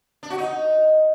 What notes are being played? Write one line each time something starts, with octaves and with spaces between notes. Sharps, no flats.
D4
F#4
D#4